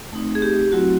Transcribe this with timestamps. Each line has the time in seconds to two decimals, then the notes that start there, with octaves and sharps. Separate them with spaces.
0.13 A3 C4 D#4
0.35 G#4
0.42 G4
0.72 F#3 A3 C4 E4 F#4